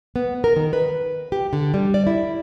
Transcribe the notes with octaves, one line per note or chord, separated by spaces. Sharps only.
B3
A#4
D#3
B4
G4
D3
G3
D5
E4